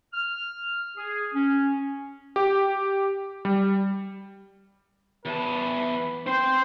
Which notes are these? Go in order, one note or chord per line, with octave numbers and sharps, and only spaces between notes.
F6
G#4
C#4
G4
G3
E2 B4 A5
C4 C5